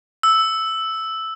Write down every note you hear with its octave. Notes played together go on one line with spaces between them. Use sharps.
E6